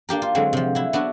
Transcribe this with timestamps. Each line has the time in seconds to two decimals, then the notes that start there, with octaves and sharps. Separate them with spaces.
0.09 A#3 D4 G4 A#4
0.22 F4
0.35 D3 F#3 G#3 C4
0.53 C3 F3
0.75 F#3 E4
0.93 B3 D4 E4 F#4